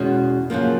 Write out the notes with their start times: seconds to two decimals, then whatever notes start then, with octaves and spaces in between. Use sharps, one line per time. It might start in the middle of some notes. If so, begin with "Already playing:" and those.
Already playing: E2 B2 G#3 C#4 F#4
0.50 F#2 C#3 F3 A#3